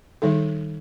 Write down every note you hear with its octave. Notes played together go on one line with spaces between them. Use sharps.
D#3 G3 D#4 A4